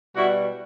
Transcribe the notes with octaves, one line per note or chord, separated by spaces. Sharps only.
B2 G3 E4 F#4